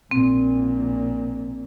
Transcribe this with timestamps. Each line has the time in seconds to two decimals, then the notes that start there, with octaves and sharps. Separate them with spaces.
0.11 A#1 A#2 C4